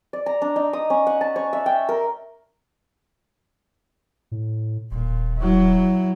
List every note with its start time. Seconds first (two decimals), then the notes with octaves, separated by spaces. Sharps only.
0.13 D5
0.26 A#5
0.42 D4
0.56 D#4
0.73 D#6
0.90 C#4
1.07 F#5
1.21 A5
1.36 C#5
1.53 E5
1.66 G5
1.89 A#4
4.32 A2
4.91 D#1 A#2
5.38 F#3 E4